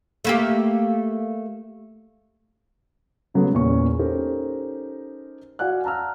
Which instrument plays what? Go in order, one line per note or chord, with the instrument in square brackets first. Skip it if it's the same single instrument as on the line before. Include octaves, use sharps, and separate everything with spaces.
[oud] A3 A#3 G4
[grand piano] C#3 F#3 G#3 A3 B3
E2 A#2 C#4 G#4 C#6
C#4 D#4 G4 A4 A#4 C5
F#4 D5 F5 F#5 G#5 F#6
A5 A#5 E6 F6